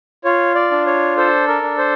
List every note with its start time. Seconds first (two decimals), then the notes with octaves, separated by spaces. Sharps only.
0.25 F4 C#5
0.55 D5
0.71 D4
0.87 C#5
1.17 A4 C5
1.48 A#4
1.63 D4
1.78 C5